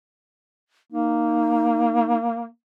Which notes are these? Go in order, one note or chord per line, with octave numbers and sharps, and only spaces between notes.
A#3 D#4